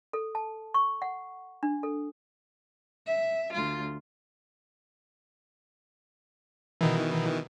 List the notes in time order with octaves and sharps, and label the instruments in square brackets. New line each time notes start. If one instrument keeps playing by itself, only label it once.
[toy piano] A4
A5
C#6
F#5
D4
A4
[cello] E5
D2 F4
[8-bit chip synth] B2 D#3 E3